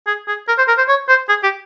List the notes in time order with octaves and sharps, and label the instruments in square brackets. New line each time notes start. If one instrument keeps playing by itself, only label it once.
[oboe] G#4
G#4
A#4
C5
A#4
C5
C#5
C5
G#4
G4